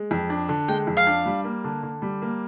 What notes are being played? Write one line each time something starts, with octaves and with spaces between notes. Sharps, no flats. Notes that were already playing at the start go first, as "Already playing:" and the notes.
Already playing: G#3
F2
D4
D3
G#3 G5
F2
F5
D4
G3
A#3
D3
D3
G3
A#3